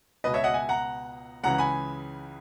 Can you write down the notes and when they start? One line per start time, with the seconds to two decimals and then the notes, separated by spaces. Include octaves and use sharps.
0.24 C#2 B2 B4 D#5
0.34 C#5 E5
0.44 D#5 F#5
0.54 E5 G#5
0.69 F#5 A#5
1.43 C#2 C#3 E3 F#5 A#5
1.58 G#5 B5